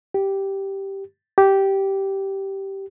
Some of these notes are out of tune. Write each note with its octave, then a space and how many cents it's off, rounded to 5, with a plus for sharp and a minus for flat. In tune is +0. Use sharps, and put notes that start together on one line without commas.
G4 -5
G4 -10